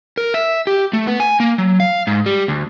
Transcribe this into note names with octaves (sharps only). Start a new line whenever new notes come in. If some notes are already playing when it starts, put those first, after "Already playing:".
A#4
E5
G4
A3
B3
G#5
A#3
F#3
F5
G#2
G3
D2